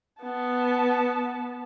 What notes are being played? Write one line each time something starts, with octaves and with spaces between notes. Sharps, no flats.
B3 A5